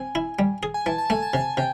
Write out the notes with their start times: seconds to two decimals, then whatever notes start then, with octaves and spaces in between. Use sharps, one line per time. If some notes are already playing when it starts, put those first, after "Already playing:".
Already playing: C4 G#5
0.15 E4
0.39 G3
0.63 G#4
0.74 G#5
0.86 E3 A5
0.98 A5
1.10 A3 G#5
1.23 A5
1.34 C3 G#5
1.57 C3 G5